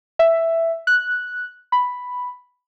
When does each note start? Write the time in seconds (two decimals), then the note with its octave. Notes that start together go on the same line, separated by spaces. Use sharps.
0.19 E5
0.87 F#6
1.72 B5